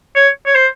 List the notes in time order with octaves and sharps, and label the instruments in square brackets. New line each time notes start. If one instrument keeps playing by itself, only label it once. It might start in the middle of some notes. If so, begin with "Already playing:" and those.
[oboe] C#5
C#5
C5